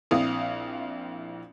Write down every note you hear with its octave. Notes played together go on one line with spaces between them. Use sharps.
A#1 C4 E4 F5 D#6